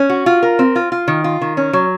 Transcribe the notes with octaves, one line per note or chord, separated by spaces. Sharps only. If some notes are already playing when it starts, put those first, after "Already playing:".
Already playing: C#4
F#4
F4
A#4
C4
F4
F4
D#3
F4
D#3
C#4
F#3